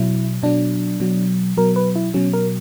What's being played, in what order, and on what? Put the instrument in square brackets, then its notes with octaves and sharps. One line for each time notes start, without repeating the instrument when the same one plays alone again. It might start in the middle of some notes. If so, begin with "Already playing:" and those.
Already playing: [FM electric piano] B2 F#3 E4
B2 F#3 D4
B2 F#3
B2 F#3 A#4
B4
E4
B2 F#3 C#4
A#4